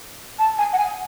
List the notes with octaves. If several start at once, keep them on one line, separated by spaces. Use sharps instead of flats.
A5
G#5
F#5
G#5